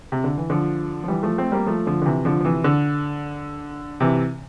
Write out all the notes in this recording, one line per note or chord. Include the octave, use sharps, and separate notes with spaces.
C3
D3
E3
D3 F3
F3
E3 G3
F3 A3
A3 C4
G3 A#3
F3 A3
D3 F3
D3
C3 E3
D3 F3
F3
C3 E3
D3
C3 E3